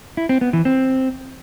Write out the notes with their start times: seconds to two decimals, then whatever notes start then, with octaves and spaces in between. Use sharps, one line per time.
0.17 E4
0.29 C4
0.41 B3
0.53 E3
0.65 C4